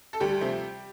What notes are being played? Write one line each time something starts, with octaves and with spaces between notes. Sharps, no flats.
A4
D2 G3 G4
C3 F3 A3